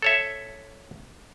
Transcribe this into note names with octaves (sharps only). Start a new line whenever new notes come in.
A4 C#5 E5